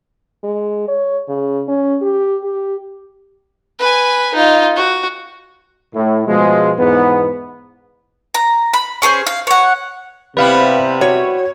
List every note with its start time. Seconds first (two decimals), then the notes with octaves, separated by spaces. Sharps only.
0.44 G#3
0.88 C#5
1.28 C#3
1.68 C#4
2.02 G4
2.44 G4
3.79 B4 G#5
4.34 D#4 F4
4.76 F#4
5.94 A2
6.27 B2 F3 G#3
6.79 E2 G#2 B3
8.34 A#5
8.73 B5
9.02 C#4 G#4 A4 C5
9.27 F5
9.47 C#5 F#5
10.37 C3 G3 B3 E4 B4 F5
11.01 F#4 C#5